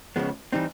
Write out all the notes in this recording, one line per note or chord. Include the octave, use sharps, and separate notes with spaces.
C#2 C#3 F3 G#3 B3
E3 G3 C4 D#4